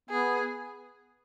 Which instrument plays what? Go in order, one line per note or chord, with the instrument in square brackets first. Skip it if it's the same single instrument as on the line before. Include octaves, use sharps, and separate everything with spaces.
[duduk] B3 [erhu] G#4